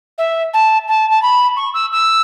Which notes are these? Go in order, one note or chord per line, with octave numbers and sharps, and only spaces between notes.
E5
A5
A5
A5
B5
C#6
E6
E6